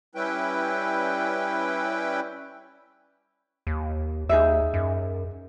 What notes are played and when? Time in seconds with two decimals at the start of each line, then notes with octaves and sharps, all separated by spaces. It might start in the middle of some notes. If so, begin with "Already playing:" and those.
0.15 G3 C#4 E4 B4 G5
3.67 D#2
4.29 D#2 D#4 G#4 E5
4.74 F#2